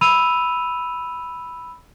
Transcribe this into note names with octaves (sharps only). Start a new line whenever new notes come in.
B5 E6 D#7 F7